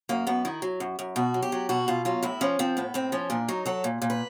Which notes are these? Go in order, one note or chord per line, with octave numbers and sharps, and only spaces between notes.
F#2 A#3
F#2 B3
D#3 E4
F#3
F#2
F#2
B2 F#4
F#3
G4
F#3
B2 F#4
B2 F4
F#3 F4
A2 E4
F3 C#4
F3 C4
A2 B3
A2 C4
F3 C#4
A#2 D4
F#3 D#4
F#3 A4
A#2
A#2
B4